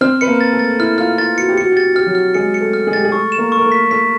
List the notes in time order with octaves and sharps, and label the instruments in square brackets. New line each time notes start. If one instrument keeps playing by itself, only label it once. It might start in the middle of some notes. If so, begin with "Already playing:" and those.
[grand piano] C4 C5 [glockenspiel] F6
[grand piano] B4 [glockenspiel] C#7
[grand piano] A#3 A#4
[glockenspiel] A6
[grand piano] A3 A4
[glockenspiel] A6
[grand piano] E4 [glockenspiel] F6
[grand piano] F4 [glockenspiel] F6
[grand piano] F4 [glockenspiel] A6
[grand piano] F#4 [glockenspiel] C#7
[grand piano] G4
[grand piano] F#4 [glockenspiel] C#7
[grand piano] G4 [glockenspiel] A6
[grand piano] F#4
[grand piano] G4 [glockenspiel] F6
[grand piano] F#3 F#4
[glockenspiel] F6
[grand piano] G#3 G#4 [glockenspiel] C#7
[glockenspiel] C#7
[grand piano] A3 A4
[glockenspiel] F6
[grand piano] G#3 G#4
[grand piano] G4 [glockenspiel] A6
[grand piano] G#4
[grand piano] A3 A4 [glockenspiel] C#6
[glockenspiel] E7
[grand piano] A#3 A#4
[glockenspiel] C#6
[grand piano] A#4
A3 A4
[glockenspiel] B6
[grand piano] A3 A4 [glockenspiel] B6